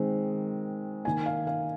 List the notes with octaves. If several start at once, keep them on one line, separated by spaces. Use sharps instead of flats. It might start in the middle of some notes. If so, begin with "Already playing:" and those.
Already playing: D#3 G#3 C4
D#3 A#3 G#5
F5
F5